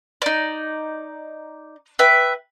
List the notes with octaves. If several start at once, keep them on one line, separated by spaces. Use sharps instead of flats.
D#4 D5
B4 E5 G5